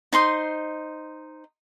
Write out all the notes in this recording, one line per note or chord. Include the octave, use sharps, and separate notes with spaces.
D#4 C5 C6 D#6